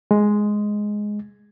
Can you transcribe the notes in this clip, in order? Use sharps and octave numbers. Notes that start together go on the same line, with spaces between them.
G#3